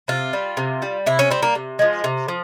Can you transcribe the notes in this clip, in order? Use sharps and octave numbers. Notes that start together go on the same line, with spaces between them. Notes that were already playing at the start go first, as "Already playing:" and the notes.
C3 F4
G3
C3
G3
C3 E4
C#4
G3 C4
A#3
C3
F3 G#3
C3
F3